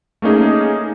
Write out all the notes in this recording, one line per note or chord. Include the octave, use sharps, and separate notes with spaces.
A3 A#3 C#4 D#4 G#4